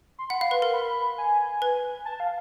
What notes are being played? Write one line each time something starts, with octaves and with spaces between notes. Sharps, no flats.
C6
F#5 B5
F5
B4 C6
A#4
B5
G#5
B4
A5
F5